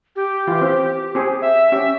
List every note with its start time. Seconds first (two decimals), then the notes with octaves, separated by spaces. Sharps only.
0.16 G4
0.47 E3 F4
0.61 C4
1.15 C4 G4 G#4
1.42 E5
1.72 C#4 G4